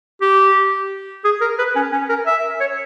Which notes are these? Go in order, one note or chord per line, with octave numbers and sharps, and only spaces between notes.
G4
G#4
A#4
B4
C#4
C#4
A#4
E5
C#5